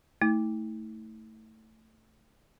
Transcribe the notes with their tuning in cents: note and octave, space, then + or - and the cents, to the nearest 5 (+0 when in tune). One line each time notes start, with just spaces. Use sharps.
A3 +15 E4 -45